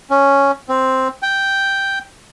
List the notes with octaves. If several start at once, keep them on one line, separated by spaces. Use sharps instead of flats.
C#4
C4
G5